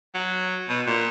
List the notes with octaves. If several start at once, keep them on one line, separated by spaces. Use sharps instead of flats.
F#3
B2
A#2